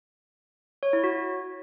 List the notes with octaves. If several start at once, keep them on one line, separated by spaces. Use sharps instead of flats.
C#5
E4
F#4